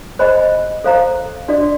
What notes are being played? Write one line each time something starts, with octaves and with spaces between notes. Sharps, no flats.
G#4 C5 D#5 G#5 B5
A4 C5 F5 A#5
D4 F#4 A4 D5